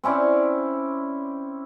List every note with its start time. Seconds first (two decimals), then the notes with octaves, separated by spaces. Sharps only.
0.04 C4 C#4 E4 D5